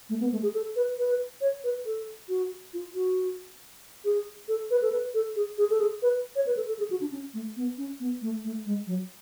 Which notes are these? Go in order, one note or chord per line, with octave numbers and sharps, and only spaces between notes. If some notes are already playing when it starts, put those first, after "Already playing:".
A3
B3
A3
G#4
A4
B4
B4
C#5
B4
A4
F#4
F4
F#4
G#4
A4
B4
A4
B4
A4
G#4
G#4
A4
G#4
B4
C#5
B4
A4
A4
G#4
F#4
D4
C#4
A3
B3
C#4
B3
A3
A3
G#3
F#3